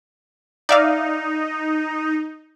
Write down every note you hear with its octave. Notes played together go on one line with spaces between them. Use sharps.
D#4 D5 E5 F5